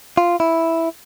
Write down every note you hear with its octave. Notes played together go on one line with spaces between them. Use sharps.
F4
E4